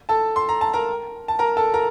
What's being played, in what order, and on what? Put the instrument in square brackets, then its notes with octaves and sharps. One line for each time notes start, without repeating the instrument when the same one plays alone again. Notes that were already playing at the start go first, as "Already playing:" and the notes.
[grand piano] A4 A5
C6
A#5
A5
A#4 A#5
A5
A#4 A#5
A4 A5
A#4 A#5